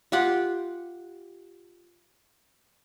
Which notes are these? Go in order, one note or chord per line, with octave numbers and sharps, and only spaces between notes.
F4 G4 F#5